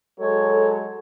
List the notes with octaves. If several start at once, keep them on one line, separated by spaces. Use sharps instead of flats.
F#3 G#3 A4 C#5